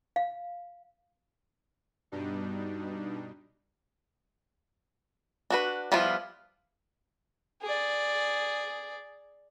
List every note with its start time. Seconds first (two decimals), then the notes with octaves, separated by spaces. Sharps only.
0.16 F5
2.12 G2 B2 G3 D4 D#4
5.50 D4 F#4 B4
5.92 F3 G3 B3 E4 F4
7.62 G#4 D5